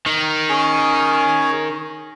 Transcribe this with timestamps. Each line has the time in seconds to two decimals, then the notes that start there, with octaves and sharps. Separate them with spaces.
0.06 D#3
0.49 C#4 G#4 G#5